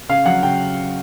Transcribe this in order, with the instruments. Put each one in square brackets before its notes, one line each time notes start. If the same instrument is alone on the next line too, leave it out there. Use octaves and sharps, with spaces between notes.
[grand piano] C#3 F5
F#3 F#5
C#3 G5